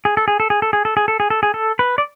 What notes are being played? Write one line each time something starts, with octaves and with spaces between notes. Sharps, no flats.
G#4
A4
G#4
A4
G#4
A4
G#4
A4
G#4
A4
G#4
A4
G#4
A4
B4
D5